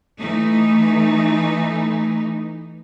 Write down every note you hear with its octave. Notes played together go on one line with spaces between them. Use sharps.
E3 A3 D#4